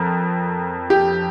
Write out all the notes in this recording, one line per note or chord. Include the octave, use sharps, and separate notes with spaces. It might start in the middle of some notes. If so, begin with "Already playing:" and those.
Already playing: F2 A#4
G4